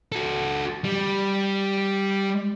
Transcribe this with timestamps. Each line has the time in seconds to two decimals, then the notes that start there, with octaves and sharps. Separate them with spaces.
0.12 F#4 A4
0.84 G3